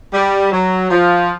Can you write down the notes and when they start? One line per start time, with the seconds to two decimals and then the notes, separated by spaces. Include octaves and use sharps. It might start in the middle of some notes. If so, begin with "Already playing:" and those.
0.13 G3
0.52 F#3
0.90 F3